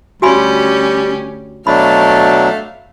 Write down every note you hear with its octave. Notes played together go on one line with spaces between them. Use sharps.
D2 G3 C#4 F#4 G4 G#5 B5
B2 F#3 A3 D4 F5 B5